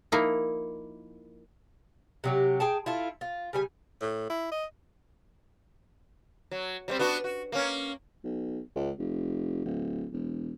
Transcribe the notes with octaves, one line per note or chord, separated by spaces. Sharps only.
F3 A#3 D#4 E4
C3 F#3 G4
G#4 G5 A5
E4 F4 A4
F4
C#3 G3 G#5
A2
E4
D#5
F#3
F#3 G3 C4
B3 D4 F#4
F#4
A#3 C#4
B1
C#2
F1
D1
E1